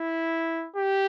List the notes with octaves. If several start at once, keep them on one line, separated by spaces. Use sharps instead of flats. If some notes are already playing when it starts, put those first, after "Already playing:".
Already playing: E4
G4